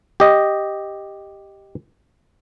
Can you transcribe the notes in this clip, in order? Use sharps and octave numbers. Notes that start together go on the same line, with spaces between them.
G4 D#5